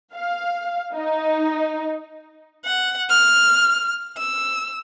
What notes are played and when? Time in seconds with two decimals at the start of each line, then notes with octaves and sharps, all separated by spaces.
0.14 F5
0.93 D#4
2.65 F#5
3.10 F6
4.18 E6